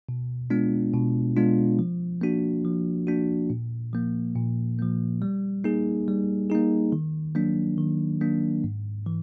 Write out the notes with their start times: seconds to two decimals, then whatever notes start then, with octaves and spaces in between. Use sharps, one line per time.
0.09 B2
0.50 G#3 B3 D4 F4
0.93 B2
1.36 G#3 B3 D4 F4
1.79 F3
2.21 A#3 D4 F#4
2.65 F3
3.07 A#3 D4 F#4
3.50 A#2
3.93 F3 A#3
4.36 A#2
4.79 F3 A#3
5.22 G3
5.64 A#3 D#4 G#4
6.08 G3
6.50 A#3 D#4 G#4
6.92 D#3
7.35 F#3 A#3 D4
7.78 D#3
8.21 F#3 A#3 D4
8.64 G#2
9.06 E3